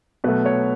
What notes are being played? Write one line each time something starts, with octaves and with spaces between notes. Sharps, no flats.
B2 F#3 A3 B4
C#5